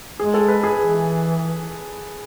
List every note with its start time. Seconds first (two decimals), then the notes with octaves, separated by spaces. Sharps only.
0.20 G#3 G#4
0.34 A4
0.48 B4
0.63 G#4
0.78 E3